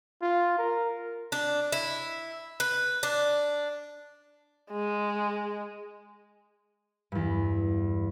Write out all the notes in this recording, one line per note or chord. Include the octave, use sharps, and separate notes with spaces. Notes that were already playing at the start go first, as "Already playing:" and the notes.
F4
A#4
D4
E4
B4
D4
G#3
E2 G2